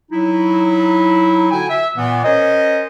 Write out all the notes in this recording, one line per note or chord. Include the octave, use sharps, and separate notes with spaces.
F#3 D#4 E4
D3 F#4 G5 G#5
E5
A#2 E3 B3
C#4 A#4 C5 C#5 D#5